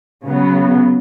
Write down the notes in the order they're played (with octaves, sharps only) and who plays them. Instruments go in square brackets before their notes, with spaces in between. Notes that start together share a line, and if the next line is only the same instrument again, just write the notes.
[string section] C#3 F#3 B3